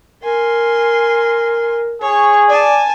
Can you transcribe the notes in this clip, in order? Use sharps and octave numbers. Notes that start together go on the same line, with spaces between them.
A#4 G#5 C6
G#4 C#5 C#6
D5 G#5 A5